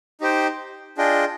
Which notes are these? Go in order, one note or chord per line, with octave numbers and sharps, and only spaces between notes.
D#4 G4 C5 G5
D4 F4 G#4 D#5 G5